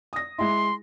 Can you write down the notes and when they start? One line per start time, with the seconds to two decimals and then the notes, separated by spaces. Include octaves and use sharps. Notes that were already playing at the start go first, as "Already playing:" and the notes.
0.13 D#6 A#6
0.38 G#3 E4 C6